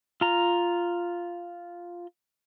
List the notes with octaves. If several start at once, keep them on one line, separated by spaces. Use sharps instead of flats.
F4 A#5